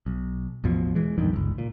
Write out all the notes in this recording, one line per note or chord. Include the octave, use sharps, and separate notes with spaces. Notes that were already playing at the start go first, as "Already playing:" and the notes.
B1
A1 E2 B2 F3
E3 G#3
A#1 E2 G2 D#3
G1 C#2
A#2